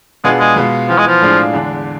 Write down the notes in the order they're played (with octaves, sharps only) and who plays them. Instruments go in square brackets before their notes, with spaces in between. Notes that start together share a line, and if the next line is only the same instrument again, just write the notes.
[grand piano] B2 B3 D4 F4 G#4 [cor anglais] G#3
[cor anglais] G#3
[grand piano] B2 G#3 B3 F4
[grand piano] E3 B3 F4 [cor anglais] F3
[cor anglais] G#3
F3
[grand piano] A2 G#3 D4 F4 G#4
E2 D3 G#3 D4